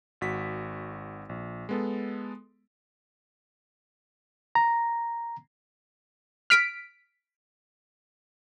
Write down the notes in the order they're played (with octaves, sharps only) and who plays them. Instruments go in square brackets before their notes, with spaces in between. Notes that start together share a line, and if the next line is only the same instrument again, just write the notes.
[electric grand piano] G#1 F#4 B6
A#1
G#3 B3 A4
[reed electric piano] A#5
[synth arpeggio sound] F6 B6 D7